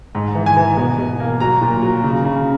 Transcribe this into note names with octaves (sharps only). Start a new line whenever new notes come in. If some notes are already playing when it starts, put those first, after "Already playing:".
G#2
E3
G#5
E3
B2
B2
A#3
F#3 A#5
A#2
F#3
C#3
C#3